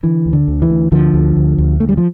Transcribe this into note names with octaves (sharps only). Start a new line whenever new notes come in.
D3 E3
D2
D3
D2
E3
D2
D2 D3 F3
D2
D2
D2
D2 A3
G3
F3